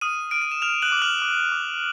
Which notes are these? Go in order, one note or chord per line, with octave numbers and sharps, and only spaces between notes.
D#6 F6 D#7
F6 D7
D#7
E7
F6 F7
F#6 F#7
D6
F#7
F6 F7
D6
D6